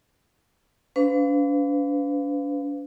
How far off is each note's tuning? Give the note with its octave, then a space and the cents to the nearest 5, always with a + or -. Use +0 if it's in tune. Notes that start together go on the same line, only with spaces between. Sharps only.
D4 -45 B4 +40 F5 +0